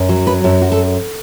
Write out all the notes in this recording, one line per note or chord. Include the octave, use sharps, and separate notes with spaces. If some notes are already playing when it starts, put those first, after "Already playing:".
Already playing: F#2
F#3
B4
F#2 A4
F#4
A4